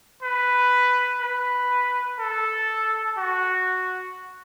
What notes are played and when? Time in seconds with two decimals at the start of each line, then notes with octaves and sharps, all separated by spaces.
0.23 B4
1.22 B4
2.19 A4
3.17 F#4